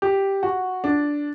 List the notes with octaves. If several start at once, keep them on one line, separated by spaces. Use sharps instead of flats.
G4
F#4
D4